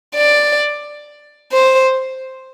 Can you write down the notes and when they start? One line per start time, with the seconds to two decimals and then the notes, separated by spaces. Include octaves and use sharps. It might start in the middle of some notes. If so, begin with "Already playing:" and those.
0.15 D5
1.52 C5